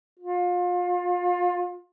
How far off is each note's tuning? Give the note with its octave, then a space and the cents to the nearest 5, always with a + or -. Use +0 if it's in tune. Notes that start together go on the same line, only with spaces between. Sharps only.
F4 +30